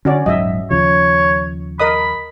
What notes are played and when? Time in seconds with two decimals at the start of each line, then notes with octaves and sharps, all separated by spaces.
0.05 D3 C#4 F#4 D5
0.26 D#1 G#2 F#3 D#5 E5
0.71 D#2 C#3 F3 C#5
1.80 A#4 D#5 B5 D#6